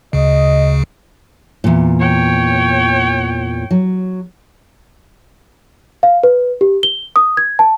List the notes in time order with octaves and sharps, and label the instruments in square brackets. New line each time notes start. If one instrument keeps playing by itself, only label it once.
[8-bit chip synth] D2 C#3 [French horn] D#5
[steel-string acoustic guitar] E2 A#2
[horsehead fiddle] C#5 G5
[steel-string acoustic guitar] F#3
[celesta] F5
B4
G4
G7
D#6
G#6
A5